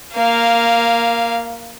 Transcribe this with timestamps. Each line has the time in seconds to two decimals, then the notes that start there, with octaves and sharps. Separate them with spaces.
0.14 A#3 F5